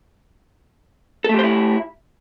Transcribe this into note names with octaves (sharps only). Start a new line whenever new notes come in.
A3 E4 G4 A4 C5